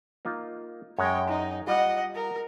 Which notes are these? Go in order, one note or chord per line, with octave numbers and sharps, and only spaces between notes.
A#3 D#4 F4
F#2 G#3 C#5 G5
D#4
G3 F4 D#5 F#5
A#4